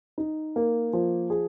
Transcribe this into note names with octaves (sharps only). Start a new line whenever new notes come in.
D#4
A#3
F3
G#4